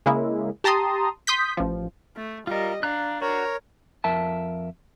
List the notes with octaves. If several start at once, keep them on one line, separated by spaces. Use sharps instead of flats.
C#3 G#3 A#3 E4
G4 A5 A#5 C6 D#6
C6 D#6 G6 B6
A1 F3
A3
G3 F4 A#4 D#5
D4 F5 A#5 F#6
F#4 A#4 C#5 A#5
F2 A#4 E5 A5